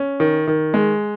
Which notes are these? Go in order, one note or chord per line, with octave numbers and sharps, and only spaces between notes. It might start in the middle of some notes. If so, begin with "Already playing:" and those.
Already playing: C#4
D#3
D#3
G#3